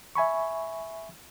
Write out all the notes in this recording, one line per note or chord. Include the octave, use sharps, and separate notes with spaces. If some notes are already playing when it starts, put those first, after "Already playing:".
E5 G#5 B5 C#6